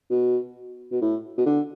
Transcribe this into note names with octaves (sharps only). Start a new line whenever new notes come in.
B2
B2
A2
B2
D3